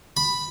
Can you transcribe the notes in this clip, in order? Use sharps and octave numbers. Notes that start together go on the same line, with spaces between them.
B5